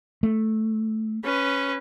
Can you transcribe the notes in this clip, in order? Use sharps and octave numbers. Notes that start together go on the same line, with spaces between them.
A3
C#4 B4